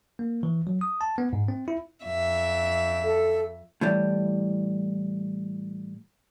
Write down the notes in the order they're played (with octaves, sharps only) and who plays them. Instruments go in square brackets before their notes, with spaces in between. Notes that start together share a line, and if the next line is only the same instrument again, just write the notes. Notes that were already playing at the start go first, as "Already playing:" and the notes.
[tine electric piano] A#3
E3
F#3
D#6
A5
B3
G#2
C4
E4
[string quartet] F2 E5
[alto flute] A4
[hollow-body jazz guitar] A2 E3 G3